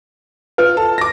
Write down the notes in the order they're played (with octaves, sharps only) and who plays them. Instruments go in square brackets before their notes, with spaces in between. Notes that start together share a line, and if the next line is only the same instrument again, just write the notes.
[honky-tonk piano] F4 [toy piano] B4
[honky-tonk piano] A4
D6 A#6